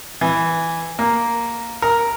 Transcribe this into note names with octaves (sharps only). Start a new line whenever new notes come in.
E3
A#3
A#4